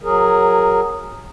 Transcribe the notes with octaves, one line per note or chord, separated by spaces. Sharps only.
F#3 G#4 A#4